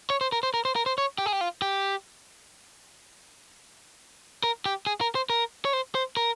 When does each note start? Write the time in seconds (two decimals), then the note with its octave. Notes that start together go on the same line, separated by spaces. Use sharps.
0.10 C#5
0.21 C5
0.32 A#4
0.43 C5
0.54 A#4
0.65 C5
0.76 A#4
0.86 C5
0.98 C#5
1.18 G4
1.26 G#4
1.33 G4
1.41 F4
1.62 G4
4.44 A#4
4.66 G4
4.87 G#4
5.01 A#4
5.15 C5
5.30 A#4
5.65 C#5
5.73 C5
5.95 C5
6.17 A#4